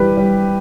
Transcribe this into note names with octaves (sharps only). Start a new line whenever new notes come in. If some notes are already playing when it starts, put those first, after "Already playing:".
Already playing: E3 G3 G4 B4
G3